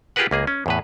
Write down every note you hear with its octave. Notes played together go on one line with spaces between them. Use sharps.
F4 G4 G#4 A#4 B4 F#5
C#2 A#3 G#4
C#4
E2 A2 B4